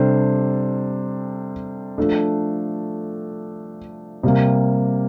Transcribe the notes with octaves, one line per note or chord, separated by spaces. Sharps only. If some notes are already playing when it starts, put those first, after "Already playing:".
Already playing: C3 G3 D4 A4 C5
F3 A3 D4 A4
C3 G3 A#3